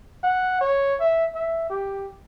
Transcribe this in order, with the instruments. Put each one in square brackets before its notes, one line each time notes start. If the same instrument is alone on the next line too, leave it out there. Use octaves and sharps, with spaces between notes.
[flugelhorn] F#5
C#5
E5
E5
G4